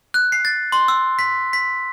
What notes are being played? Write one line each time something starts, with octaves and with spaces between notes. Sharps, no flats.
F#6
C7
A6
C6
E6
B6
B6